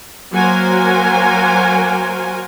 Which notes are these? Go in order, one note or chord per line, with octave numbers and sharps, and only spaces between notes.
F#3 A#3 F#4 A#4 C5 G#5